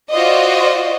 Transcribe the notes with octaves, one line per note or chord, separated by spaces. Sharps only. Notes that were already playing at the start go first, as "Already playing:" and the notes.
F4 F#4 C5 D5 D#5